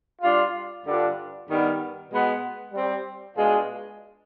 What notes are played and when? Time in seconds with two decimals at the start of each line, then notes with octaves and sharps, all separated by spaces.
0.22 G3 D4 F4
0.84 G2 D3 G3 D4 F4
1.48 G2 D#3 G3 B3
2.11 B2 G#3 B3
2.73 G3 C4 G4
3.36 B2 G#3 D4 F4 G#4